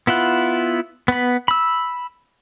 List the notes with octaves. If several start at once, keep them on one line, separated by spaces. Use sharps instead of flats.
B3 E4 F4 F#5
B3 B5
B5 E6